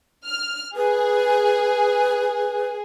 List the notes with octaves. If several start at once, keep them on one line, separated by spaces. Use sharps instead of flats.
F6
G#4 B4